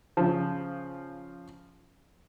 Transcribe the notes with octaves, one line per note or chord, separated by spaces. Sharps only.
C#3 F3